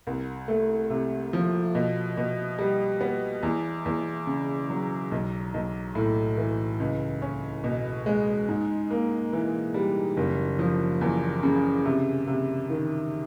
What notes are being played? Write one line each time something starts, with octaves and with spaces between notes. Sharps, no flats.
C2
A3
C3
F3
B2
B2
G3
B3
E2
E2
C#3
F#3
B1
B1
A2
E3
C#2
C#4
B2
G#3
G#2
A#3
E3
G3
F#1
F3
E2
C#3
C3
C3
D#3